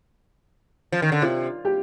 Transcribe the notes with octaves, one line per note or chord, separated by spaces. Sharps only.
F3
D#3
D3
C3 F4
G4